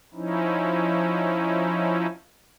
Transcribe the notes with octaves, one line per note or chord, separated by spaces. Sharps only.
F3 C#4 D#4 E4